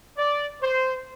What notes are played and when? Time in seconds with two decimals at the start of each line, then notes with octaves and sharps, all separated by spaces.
0.18 D5
0.62 C5